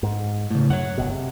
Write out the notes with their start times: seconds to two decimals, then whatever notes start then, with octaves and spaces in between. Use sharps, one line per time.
0.03 G#2
0.51 A2 C#3
0.70 F#2 C#5 F#5
0.98 G1 C#2 B2
1.11 C3